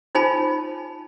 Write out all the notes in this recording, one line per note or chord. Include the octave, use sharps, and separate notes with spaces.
D#4 F4 C5 G#5 A5 B5